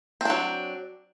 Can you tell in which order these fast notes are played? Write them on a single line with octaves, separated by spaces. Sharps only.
C4 D4 F#3